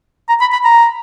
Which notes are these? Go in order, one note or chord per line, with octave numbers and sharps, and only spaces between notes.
A#5
B5
B5
A#5